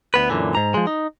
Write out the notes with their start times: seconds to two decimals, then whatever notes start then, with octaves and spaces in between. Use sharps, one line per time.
0.14 D2 B3 B4
0.30 F#2 A#2 D3 E3
0.55 G#2 A#5
0.74 F3 G#3
0.87 D#4